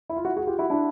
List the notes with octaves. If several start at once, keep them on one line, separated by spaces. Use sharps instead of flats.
E4
F4
E4 F#4
F#4 G#4
F4 G4
E4 F#4
D4 E4